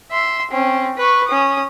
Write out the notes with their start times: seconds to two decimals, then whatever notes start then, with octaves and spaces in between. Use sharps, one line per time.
0.11 E5 C6
0.51 C4 C#4
0.97 B4 C#6
1.28 C#4 D#6